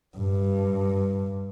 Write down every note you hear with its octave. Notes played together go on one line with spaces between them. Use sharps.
G2